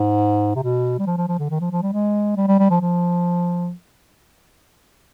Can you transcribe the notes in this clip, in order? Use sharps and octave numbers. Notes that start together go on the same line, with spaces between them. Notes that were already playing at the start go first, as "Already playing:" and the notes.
Already playing: G#2
C3
B2
G3
F3
F3
F3
D3
D#3
F3
F3
G3
G#3
G3
G3
G3
F3
F3